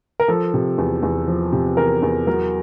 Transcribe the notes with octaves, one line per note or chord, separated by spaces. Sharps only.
A#4
F3 A4
C3
E2
E2
F3
C3
E2 A#4
E2
F#3 A#4